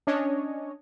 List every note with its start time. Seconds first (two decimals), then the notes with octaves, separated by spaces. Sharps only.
0.07 C#4 D4 C#5 D#5